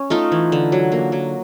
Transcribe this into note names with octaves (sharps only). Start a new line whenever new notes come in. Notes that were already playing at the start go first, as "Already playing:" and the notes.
Already playing: C#4
A3 D#4 F4
E3
D3
F#3
A#3
F#3